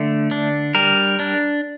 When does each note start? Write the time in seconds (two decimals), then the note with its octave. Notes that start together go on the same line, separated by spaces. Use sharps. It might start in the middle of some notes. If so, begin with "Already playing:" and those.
Already playing: D3 A3
0.31 D4
0.75 G3 A#4
1.20 D4